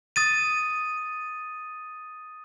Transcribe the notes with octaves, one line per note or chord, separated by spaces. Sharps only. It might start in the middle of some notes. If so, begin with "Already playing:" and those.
D#6 A6 D#7